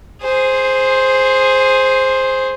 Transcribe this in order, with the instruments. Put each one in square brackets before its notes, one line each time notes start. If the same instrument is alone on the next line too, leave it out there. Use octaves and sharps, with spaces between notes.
[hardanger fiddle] G#4 C5